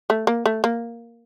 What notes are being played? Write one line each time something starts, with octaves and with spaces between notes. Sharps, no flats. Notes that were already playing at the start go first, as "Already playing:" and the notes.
A3
A#3
A3
A#3